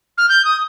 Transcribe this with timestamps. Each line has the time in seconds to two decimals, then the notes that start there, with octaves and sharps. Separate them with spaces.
0.18 F6
0.29 G6
0.45 D#6